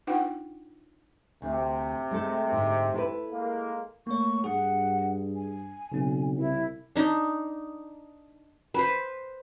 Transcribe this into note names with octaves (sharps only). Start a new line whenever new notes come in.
D4 D#4 F4 B4 F#5 G5
D2 C3
G#3 A3 A4
G#2 D3
E4 A4 B4
G#3 A#3
A3 A#3 C#5 C#6
G2 G#4 F#5
G#5
B1 C#3 C4
C2 E4
D4 D#4
B4 C5